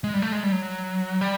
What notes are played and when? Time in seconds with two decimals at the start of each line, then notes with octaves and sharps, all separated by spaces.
0.04 G#3
0.13 G3
0.22 A3
0.33 G#3
0.43 G3
0.52 F#3
1.21 G3